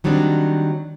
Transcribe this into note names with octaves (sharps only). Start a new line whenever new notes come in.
D#3 F#3 G3 C4 D4